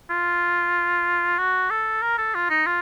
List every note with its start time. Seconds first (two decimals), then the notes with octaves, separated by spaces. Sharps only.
0.10 F4
1.38 F#4
1.70 A4
2.02 A#4
2.18 A4
2.34 F4
2.50 D#4
2.66 F4